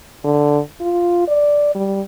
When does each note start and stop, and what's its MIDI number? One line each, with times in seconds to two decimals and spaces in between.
0.24 0.59 50
0.81 1.24 65
1.27 1.74 74
1.75 2.02 55